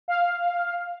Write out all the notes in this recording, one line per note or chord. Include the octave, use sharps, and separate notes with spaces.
F5